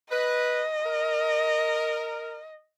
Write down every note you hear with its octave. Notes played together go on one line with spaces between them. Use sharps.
B4 D#5
A#4